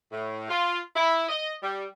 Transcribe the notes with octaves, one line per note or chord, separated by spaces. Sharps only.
A2
F4
E4
D#5
G3